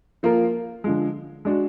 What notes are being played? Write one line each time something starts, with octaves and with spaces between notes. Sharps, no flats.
F3 A#3 F4 A#4
D3 F3 G#3
G#3 D4 F#4